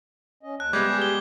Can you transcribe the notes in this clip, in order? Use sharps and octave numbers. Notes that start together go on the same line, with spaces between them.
C#4 D#5
D#2 A5 F#6
C3 G3 G#3 B3 E5 D6 G6 G#6
G4 G#4
G7